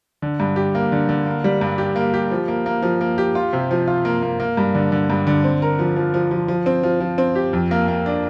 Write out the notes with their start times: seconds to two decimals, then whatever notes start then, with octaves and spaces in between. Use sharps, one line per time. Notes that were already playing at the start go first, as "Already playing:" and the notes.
0.22 D3
0.40 G2
0.56 G4
0.75 A#3
0.92 D3
1.09 D3
1.26 A#3
1.44 G3
1.61 G2
1.78 G4
1.96 A#3
2.14 G4
2.31 F3
2.48 A#3
2.66 A#3
2.82 F3
3.01 A#3
3.18 G4
3.35 F4
3.53 C3
3.71 F3
3.88 F4
4.05 A#3
4.22 A#3
4.40 A#3
4.57 G2
4.75 D3
4.92 D3
5.10 G2
5.27 D3
5.44 C4
5.62 A#4
5.79 F3
5.96 F3
6.14 F3
6.31 F3
6.48 F3
6.66 C4
6.83 F3
7.00 F3
7.18 C4
7.35 G4
7.53 F2
7.71 A#3
7.88 A#3
8.06 D4